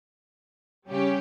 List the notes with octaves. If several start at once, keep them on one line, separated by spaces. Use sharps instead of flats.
C#3 G3 C#4 G4